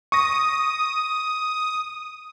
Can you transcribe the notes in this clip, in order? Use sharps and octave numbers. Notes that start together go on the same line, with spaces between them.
C#6 D#6 A#6